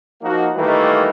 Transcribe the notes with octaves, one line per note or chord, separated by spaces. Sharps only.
F3 A#3 D#4 F#4
D#3 E3 G3 A3 A#3